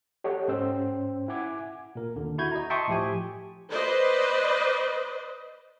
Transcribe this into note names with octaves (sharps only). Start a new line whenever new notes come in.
G4 A4 C#5 D#5 F#5 G5
G#2 C#4 C5 G5 E6
E4 F#5 G#5 D6 G#6
A#2 A#4
D#2 D3
E4 F#4 G6 G#6
D#5 A#5
E5 G5 A5 C6 C#6 D#6
A2 F3 G4 G#5
B4 C5 D5 D#5